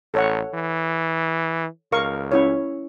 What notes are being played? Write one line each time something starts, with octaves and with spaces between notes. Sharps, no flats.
A1 A4 C#5 F#5
E3
C#2 A#4 F5 C#6
C#4 E4 C#5